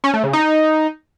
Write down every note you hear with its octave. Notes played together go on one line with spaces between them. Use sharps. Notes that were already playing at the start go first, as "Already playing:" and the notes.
C#4
A3
C#3
D#4